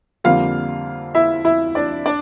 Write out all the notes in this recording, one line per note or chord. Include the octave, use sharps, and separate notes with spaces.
F2 D3 G3 A#3 F4 F5
E4 E5
E4 E5
D4 D5
D4 D5